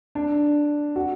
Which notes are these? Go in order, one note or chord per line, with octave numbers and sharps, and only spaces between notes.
D4
F#4